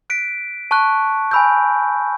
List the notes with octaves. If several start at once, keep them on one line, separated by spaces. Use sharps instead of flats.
F#6 B6 D7
A5 C#6 F#6
G#5 B5 E6 G6